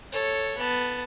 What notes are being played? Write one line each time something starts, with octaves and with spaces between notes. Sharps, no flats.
A4 C#5
B3 A5